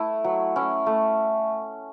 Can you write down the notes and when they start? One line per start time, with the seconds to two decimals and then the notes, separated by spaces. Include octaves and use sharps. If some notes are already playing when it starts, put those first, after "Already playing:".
Already playing: A3 E4
0.24 F#3
0.56 C#4 E4
0.86 A3